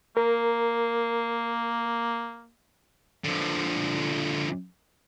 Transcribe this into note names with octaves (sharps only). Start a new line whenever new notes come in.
A#3 A#4
D3 F3